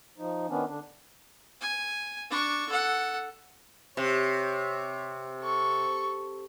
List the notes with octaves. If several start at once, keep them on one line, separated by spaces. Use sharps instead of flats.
F3 D#4
D#3 B3 C#4 D4
D3 D4
G#5
D4 C#6
A4 F#5
C3 C#5
A4 C#6